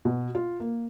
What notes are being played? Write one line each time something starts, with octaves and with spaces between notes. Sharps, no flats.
B2
F4
A#3